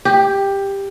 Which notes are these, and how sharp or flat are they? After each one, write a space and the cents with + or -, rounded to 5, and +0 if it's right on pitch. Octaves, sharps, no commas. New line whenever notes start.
G4 +10